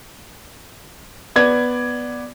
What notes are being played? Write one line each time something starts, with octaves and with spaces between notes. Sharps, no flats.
B3 D5 G#6